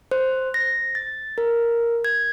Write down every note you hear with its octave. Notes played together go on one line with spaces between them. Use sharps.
C5
A#6
A6
A#4
G#6